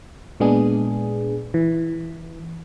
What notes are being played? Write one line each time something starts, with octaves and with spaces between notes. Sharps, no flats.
A#2 G#3 B3 D4 G#4
E3